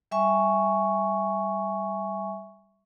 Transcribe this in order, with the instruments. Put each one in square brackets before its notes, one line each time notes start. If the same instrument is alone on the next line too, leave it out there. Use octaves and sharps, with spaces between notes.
[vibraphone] G3 E5 G#5 C#6